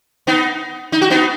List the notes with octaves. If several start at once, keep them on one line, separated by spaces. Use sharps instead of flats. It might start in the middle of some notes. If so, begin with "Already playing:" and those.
B3 D#4
D#4
F#4
B3 D#4